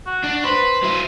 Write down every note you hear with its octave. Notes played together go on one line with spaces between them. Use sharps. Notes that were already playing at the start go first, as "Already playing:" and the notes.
F#4
D4
B4 C5
F#3 E4